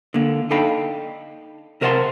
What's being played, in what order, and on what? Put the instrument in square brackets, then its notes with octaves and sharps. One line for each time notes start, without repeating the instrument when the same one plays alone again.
[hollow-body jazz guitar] D3 A#3
D4 D#4 A4 F5 G5 B5
C3 A#4 C5 F#5 A5 C6